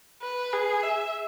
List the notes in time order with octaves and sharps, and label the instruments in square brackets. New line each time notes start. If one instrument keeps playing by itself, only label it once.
[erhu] B4
G#4
E5